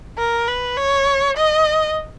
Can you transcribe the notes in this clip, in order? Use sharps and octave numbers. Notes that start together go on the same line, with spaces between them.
A#4
B4
C#5
D#5